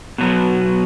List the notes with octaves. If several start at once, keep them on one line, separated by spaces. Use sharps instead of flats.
B2 F#3 B3